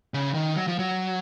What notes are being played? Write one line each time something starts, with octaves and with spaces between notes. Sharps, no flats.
C#3
D#3
F#3
F3
F#3